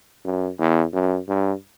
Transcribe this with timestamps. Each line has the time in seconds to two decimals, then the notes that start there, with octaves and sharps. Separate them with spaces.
0.25 F#2
0.59 E2
0.93 F#2
1.28 G2